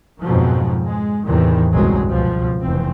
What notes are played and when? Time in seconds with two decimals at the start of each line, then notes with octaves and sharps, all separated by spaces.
0.21 F2 G#2 B2 F3 F#3
0.85 G#3
1.25 E2 A2 C3 D#3 E3
1.72 G1 C2 F#2 B2 F#3 G#3
2.08 C#2 B2 F3
2.62 F1 E2 E3 C4